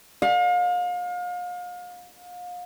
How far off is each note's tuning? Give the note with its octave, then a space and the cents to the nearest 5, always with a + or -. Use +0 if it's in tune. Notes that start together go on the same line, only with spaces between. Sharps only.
F5 +35